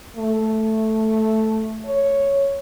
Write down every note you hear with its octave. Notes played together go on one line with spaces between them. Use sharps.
A3
C#5